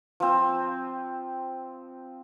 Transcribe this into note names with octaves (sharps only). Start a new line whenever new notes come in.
F3 C4